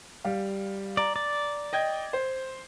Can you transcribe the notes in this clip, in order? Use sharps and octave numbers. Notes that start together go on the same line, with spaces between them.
G3 F5
D5 A#5
D5
D#5 G5 G#6
C5